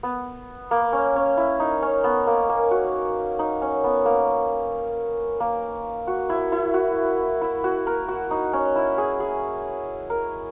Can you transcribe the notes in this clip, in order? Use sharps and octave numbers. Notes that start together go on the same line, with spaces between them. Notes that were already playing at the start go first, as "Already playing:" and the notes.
B3
A#3
C#4
C#4
E4
D#4
C#4
B3
A#3
A#3
F#4
D#4
C#4
B3
A#3
A#3
F#4
E4
E4
F#4
E4
F#4
A#4
F#4
D#4
C#4
E4
G#4
G#4
A#4